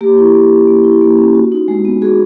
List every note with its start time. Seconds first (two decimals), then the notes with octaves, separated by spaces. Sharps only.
0.01 A#3 G4
0.17 E4
0.34 A#3
0.51 C#4
0.68 A#3
0.84 E4
1.02 A#3
1.18 C#4
1.35 F#4
1.52 D#4
1.68 G#3
1.85 B3
2.02 F#4 G#4